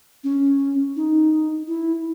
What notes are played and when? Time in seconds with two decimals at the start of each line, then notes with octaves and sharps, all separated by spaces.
0.24 C#4
0.96 D#4
1.68 E4